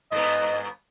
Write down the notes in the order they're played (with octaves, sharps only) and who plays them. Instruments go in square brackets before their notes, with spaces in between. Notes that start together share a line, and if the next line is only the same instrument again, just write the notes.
[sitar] G2 B3 [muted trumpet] D#5